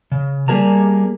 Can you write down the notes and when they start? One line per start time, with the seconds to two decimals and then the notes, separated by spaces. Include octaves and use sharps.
0.12 C#3
0.48 G3 A#3 G#4 A#4 A5 A#5